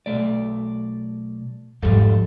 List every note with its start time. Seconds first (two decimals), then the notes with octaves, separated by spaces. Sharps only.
0.06 B1 A3 D5
1.82 E2 G#2 F3 G3 A4